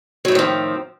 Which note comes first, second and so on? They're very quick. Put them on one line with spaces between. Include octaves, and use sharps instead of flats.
F#3 A2 C4 D#3 F3